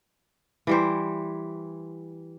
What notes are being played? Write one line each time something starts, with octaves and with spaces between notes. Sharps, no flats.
E3 G3 C5